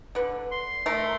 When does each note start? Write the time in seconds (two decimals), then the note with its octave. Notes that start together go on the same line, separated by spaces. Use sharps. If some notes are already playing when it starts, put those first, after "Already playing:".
0.15 D3 B4
0.51 C6
0.86 A3 A#4